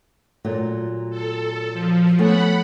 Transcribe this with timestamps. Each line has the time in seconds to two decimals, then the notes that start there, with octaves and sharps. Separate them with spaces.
0.45 A#2 F#3 A3
1.10 A4
1.72 F3
2.19 A3 B3 C#4 F#5 B5